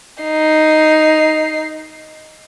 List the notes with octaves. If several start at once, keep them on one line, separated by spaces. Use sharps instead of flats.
D#4 C7